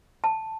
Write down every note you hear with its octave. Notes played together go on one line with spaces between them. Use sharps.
A5